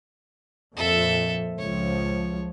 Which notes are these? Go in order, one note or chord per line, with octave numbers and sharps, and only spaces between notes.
F2 A#2 F3 A4 E5
C#2 F3 C#5